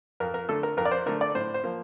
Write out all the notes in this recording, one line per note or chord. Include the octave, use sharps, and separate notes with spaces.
F2 A#4
A#4
D3 A3 A4
A#4
F2 A#4
D5
C5
D3 A3 A#4
D5
A2 C5
C5
F3 A#3